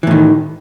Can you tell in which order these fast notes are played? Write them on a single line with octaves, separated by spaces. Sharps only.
E3 A2 D#3